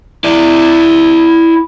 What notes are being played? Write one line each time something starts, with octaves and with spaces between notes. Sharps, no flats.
E4 D5